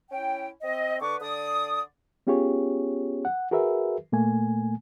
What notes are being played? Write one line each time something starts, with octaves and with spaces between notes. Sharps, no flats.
C#4 E4 G5
C4 D#5
D3 B4 C#6 D6
D3 D5 D#6
B3 C#4 F4 G4 G#4 C#5
F#5
F#4 G#4 A#4 B4 E5
A#2 A3 A#3 G#5